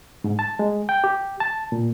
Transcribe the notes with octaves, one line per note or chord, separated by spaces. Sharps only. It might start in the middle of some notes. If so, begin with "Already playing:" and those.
G#2
A5
G#3
G5
G4
A5
A#2